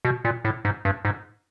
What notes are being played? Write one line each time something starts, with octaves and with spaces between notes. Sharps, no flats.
B2
A#2
A2
G#2
G2
G#2